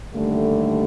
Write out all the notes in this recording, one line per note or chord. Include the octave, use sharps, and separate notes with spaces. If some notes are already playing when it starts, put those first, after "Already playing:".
D#2 D3 G3 A3